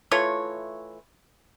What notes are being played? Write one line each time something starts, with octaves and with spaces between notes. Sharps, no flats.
E3 A3 F4 C#5